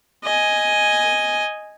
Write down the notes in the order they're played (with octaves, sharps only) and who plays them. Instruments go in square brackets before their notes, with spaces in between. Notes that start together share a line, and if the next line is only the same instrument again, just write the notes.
[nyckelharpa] D#5 G#5